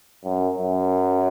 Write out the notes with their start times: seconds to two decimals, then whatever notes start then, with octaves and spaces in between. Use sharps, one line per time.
0.25 F#2
0.59 F#2